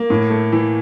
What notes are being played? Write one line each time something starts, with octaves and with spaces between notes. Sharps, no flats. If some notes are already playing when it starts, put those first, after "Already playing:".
Already playing: A#3
A2
A3
E3